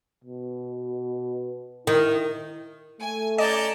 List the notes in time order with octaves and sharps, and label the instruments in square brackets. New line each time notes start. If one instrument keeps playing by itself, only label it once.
[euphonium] B2
[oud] D#3 [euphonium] E4
[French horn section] A3 [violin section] G#5
[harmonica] C#4 D5 A5 [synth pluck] D#5 [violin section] A#5 G6